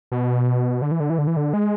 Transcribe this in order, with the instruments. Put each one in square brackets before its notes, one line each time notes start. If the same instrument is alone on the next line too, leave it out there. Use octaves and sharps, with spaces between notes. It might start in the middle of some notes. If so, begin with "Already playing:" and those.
[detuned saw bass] B2
D3
E3
D3
E3
D3
E3
D3
G#3